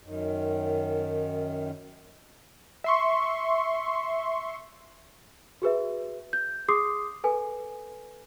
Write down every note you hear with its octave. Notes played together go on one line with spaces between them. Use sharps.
F#2 D#3
E5 C6 C#6
F#4 G#4 B4 E5
G6
G#4 C6 D6 D#6 C7
A4 B4 G#5